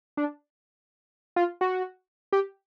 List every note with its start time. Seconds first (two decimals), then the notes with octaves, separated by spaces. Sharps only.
0.17 D4
1.36 F4
1.61 F#4
2.33 G4